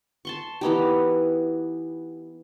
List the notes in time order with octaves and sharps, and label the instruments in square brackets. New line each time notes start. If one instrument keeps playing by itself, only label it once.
[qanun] A5 C6 C#6
E3 B3 D#4 G4